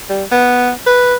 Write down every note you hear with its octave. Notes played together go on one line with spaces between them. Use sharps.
G3
B3
B4